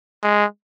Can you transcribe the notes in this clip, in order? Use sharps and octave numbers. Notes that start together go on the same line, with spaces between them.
G#3